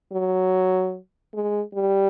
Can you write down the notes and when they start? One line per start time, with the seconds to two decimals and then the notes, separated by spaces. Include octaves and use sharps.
0.12 F#3
1.34 G#3
1.74 G3